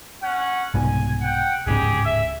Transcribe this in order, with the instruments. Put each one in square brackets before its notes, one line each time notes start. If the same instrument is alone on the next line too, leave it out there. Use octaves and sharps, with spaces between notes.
[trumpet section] C#4 F#5
[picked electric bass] C2 G#2 B2 [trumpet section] G#5
[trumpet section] F#5 G5
[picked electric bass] D1 G#2 C#3 [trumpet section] G4 G#4
[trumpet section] E5